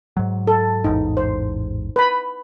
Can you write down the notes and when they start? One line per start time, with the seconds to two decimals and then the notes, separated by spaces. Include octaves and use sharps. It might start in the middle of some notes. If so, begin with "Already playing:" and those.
0.17 G#2 F#3
0.47 A4
0.84 A1 E2 G#2 D#4
1.17 C5
1.96 B4 B5